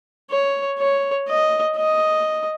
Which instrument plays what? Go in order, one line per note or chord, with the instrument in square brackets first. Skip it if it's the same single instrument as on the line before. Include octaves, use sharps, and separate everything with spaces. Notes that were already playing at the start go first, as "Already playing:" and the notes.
[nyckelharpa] C#5
C#5
D#5
D#5